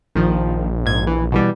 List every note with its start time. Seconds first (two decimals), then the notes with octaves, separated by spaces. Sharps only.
0.15 A#1 D#3 F3
0.86 G#2 G#6
1.07 E3
1.32 B2 E3 G3